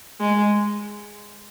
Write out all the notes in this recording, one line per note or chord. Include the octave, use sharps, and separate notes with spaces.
G#3